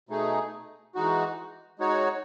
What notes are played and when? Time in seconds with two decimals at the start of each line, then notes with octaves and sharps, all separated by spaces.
0.09 B2 A3 D#4 G#4
0.95 E3 G#3 D#4 F#4
1.79 G#3 D#4 F#4 C#5